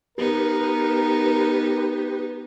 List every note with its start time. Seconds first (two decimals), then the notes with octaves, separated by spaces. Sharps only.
0.18 B3 D#4 G4 A#4 B4